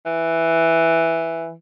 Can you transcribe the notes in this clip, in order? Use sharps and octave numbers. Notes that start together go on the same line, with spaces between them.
E3